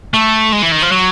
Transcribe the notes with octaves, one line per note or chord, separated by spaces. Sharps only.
A3
G#3
E3
D#3
F3
F#3